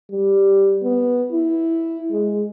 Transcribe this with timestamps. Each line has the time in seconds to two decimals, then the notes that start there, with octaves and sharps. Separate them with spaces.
0.11 G3
0.83 B3
1.32 E4
2.11 G#3